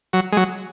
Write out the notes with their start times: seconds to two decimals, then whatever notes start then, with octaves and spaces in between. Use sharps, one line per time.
0.13 F#3
0.32 G#3
0.37 F#3